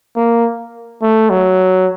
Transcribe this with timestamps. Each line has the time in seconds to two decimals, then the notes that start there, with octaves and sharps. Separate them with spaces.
0.16 A#3
1.02 A3
1.30 F#3